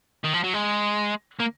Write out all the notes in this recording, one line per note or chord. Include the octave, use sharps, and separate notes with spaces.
D#3
F3
F#3
G#3
A#3